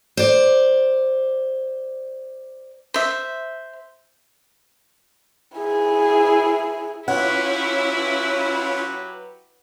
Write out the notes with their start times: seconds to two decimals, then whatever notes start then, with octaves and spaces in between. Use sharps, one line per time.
0.17 C5 D5
2.94 C5 E5
5.58 E4 G#4
7.08 F#3 C#4 E4 F4 G4 B4 C#5 F#5